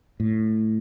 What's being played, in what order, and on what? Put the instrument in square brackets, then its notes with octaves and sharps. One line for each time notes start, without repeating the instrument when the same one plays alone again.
[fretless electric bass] A2